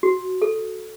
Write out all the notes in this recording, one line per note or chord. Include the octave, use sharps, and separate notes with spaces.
F#4
A4